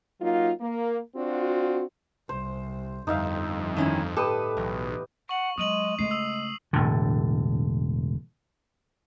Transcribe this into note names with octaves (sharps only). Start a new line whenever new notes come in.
F#3 A#3 D#4 F4
A#3
C4 D4 F4 F#4
C2 C5
G1 F2 G3 D#4 E5 F5
D#3 C#4 E4
A2 G4 A4 B4 D#6
B1 E2
F#5 C#6 F#7
F#3 G#3 D#6 D#7 F#7
C#3 G#3 A3 C7
D#6 E6
E1 A2 D3